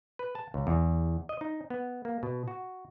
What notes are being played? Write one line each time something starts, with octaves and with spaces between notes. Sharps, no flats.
B4
A5
C#2
E2
D#5
D#4
B3
A#3
B2
F#4